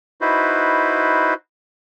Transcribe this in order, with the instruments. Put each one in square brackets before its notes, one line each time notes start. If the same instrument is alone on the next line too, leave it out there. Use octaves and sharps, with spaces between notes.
[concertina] D#4 E4 F#4 B4 C5